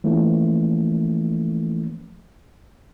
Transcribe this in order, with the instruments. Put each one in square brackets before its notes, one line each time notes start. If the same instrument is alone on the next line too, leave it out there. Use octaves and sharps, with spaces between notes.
[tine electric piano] E3 F3 A3 A#3 C#4